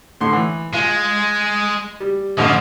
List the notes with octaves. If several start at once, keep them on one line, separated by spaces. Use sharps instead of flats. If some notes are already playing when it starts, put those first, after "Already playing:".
A2 D3 C6
E3
G#3 F4
G3
A1 D3 F3 D#5